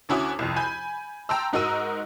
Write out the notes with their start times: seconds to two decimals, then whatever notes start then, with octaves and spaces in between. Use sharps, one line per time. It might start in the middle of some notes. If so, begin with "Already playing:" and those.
0.09 D2 C#4 E4 F#4 D6 D#6
0.39 C2 F2
0.56 G#5 B5 G6
1.29 G5 A5 A#5 C6 E6
1.53 G#2 D#4 F#4 A#4 E6 D#7